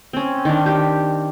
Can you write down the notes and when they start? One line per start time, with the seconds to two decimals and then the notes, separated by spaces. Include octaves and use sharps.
0.13 C4 C#4
0.45 D#3 D4
0.66 G4